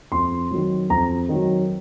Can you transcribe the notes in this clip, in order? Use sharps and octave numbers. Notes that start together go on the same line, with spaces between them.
F2 C6
D#3 F#3
F2 A#5
D#3 F#3